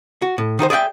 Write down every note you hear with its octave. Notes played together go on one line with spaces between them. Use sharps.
F#4
A2
D#3 D#4 F#4 C5
G#4 D5 E5 F#5 G5